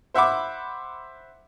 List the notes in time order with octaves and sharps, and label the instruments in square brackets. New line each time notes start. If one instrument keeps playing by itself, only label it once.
[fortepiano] C5 E5 F#5 B5 D6